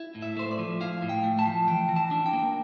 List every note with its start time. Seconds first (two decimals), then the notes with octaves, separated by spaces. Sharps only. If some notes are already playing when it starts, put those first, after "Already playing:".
Already playing: E4
0.15 A2
0.22 E5
0.37 A3 C5
0.51 D5
0.59 F3
0.81 E4 F5
1.02 A2
1.09 G5
1.24 A3
1.39 A5
1.45 F3
1.68 E3 G5
1.89 E3
1.96 A5
2.11 D4
2.26 G5
2.33 A#3